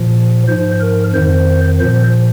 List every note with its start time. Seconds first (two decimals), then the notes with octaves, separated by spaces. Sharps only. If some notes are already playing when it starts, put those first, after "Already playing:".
Already playing: A#2 F3
0.47 G#2 F3 C5
0.80 A#4
1.13 F2 D#3 C5
1.79 A#2 F3 C5